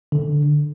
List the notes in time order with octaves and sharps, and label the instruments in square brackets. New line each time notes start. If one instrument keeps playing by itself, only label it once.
[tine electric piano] D3